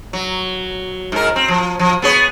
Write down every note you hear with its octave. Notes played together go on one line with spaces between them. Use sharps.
F#3
G#2 A#4
C4
F3
F3
B3 G#4 C#5